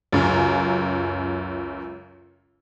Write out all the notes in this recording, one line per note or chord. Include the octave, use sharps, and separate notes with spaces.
C#2 F#2